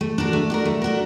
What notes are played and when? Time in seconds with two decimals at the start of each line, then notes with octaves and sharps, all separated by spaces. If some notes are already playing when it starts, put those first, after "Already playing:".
0.01 A3
0.18 D4 F#4 A#4
0.33 A3
0.50 D4 F#4 A#4
0.65 A3
0.82 D4 F#4 A#4